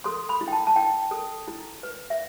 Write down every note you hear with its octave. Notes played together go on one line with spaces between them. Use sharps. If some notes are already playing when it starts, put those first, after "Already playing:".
A4 C6
B5
E4
G5
A5
A5
E4 G5
A4
E4
B4
E5